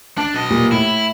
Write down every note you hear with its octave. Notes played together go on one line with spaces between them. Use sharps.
D4 A5
B1 D#5
A#2 G3 A#3
A2 E4